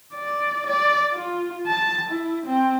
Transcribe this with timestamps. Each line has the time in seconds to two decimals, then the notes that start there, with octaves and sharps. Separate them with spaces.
0.14 D5
0.66 D5
1.12 F4
1.67 A5
2.10 E4
2.46 C4